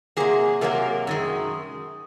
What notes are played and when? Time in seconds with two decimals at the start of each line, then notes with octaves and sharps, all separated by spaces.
0.17 C3 F#3 A#3 G#4
0.61 C3 F#3 A#3 A#4
1.07 F#2 D#3 G#3